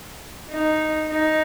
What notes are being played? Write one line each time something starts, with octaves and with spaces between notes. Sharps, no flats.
D#4
D#4